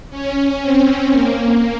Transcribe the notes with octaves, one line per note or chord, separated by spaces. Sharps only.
C#4
C4
A#3